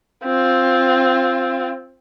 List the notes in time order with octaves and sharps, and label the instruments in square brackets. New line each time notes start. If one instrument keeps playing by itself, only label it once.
[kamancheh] C4 F4